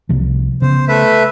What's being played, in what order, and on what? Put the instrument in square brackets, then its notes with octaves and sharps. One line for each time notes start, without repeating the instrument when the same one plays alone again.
[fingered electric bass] C2 C3 F3
[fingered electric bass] C#3 B3 [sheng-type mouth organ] C5
[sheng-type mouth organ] A3 B4 E5